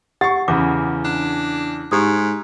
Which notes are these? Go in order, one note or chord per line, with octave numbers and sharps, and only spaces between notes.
G4 F#5 C#6 A6
E2 C#3 B5 D6
D4
G#2 G4 D#6